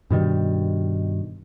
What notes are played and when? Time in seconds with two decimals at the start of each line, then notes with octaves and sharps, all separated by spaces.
0.10 G2 B2 D#3 G3